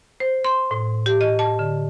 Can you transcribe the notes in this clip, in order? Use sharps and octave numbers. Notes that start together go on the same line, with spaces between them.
C5
C6
A2
G4
D#5
A5
D3